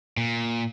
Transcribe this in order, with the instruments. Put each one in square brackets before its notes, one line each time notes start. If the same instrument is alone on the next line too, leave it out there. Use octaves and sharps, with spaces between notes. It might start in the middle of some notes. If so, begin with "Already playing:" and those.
[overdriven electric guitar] A#2